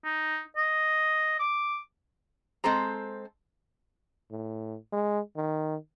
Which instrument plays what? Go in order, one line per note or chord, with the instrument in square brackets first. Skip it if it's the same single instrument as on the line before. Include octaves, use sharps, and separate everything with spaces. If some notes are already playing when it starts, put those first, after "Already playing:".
[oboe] D#4
D#5
D6
[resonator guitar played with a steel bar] G#3 C4 A4 C5 A#5
[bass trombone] A2
G#3
D#3